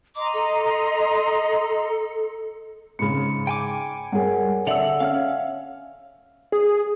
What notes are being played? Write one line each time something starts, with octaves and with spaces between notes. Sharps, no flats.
D#5 A#5 C6 D6
A4
G#2 C#3 B5 C#7
G5 G#5 D6
G2 G#4 A#4 C#5 F#5
D3 A4 D5 E5 F#5 E6 C#7 F7
C#4 F5 F6
G#4